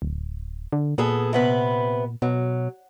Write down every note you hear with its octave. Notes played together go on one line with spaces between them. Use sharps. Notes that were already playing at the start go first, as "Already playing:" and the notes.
D1
D3
A#2 B3 G#4 A4
C3 B3 B4
B2 F#3